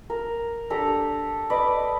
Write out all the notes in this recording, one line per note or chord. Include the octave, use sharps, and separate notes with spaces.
A#4
D4 G4 A4 A#5
B4 D5 D#5